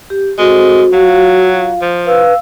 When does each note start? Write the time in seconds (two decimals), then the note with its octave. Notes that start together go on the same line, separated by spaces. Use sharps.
0.10 G4
0.39 G#3 C4 F#4 A4 C5
0.93 F#3 F4 F5
1.82 F3
2.07 B4 F5 E6